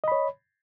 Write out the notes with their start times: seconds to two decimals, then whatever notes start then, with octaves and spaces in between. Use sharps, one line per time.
0.04 D#5
0.08 B5
0.12 C#5